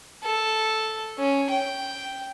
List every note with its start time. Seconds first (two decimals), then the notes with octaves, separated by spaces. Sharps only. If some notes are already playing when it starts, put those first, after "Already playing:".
0.23 A4
1.18 C#4
1.50 G5